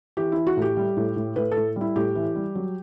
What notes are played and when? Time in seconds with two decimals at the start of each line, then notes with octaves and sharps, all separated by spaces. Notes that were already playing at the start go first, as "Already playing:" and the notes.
0.17 E3 G4
0.32 E3 E4
0.47 F#4
0.57 A2
0.62 G4
0.77 G3
0.97 A2
1.16 A2
1.36 A2 B4
1.51 A4
1.57 A2
1.76 G3 E4
1.96 A2 G4
2.15 E3
2.35 G3
2.55 F#3